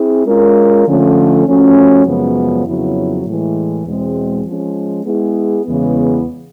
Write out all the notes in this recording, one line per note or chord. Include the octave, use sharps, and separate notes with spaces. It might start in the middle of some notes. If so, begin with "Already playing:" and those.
Already playing: C4 E4 G#4
G#3 C#4 F4 A#4
D3 F3 A3 C#4 F4
F3 A3 C#4 F#4
F#2 C#3 F3 G#3 B3
F2 C#3 F#3 B3 E4
A2 E3 G#3
E2 B2 G#3 C4
F3 G#3 C#4
G#3 B3 E4 G#4
E2 C#3 E3 G#3 B3